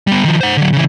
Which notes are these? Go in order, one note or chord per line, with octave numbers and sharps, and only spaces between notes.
G3 B3
D#3 F3
C5 F#5
D3 F#3
C#3 E3